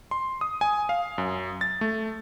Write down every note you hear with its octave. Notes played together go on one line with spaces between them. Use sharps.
C6
D#6
G#5
F5
F#2
A6
A3